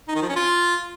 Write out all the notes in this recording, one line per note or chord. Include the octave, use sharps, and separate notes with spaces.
D#4
D#3
F3
C#4
F4